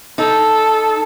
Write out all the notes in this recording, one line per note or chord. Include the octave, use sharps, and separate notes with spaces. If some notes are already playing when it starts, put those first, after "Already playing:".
D#4 A4